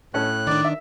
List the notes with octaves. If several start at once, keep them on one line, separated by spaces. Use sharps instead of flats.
A2 C#4 A4 F#6
D#3 D4 D5
E5